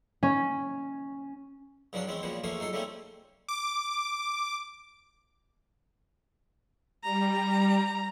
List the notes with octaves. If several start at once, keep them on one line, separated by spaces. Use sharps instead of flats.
C#4
G2 C#3 F3 F#3 D4 F4
E2 E3 G#3 C4 C#4
A#2 C#3 F3 G3 B3
E2 F3 A3 A#3 C#4 G#4
F#3 D#4 G#4 A4
C#3 G3 A3 A#3 C4 C#4
D6
G3 A#5